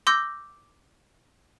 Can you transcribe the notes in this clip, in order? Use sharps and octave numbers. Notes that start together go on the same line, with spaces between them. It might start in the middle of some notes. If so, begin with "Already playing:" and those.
C6 D6 E6 G6 A#6